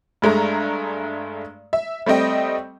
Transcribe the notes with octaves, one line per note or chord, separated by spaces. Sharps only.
G2 G#3 A3 A#5
E5
G3 A3 C4 D#5 G5